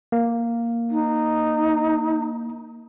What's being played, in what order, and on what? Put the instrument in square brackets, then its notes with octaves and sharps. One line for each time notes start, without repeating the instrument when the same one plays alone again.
[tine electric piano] A#3
[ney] D#4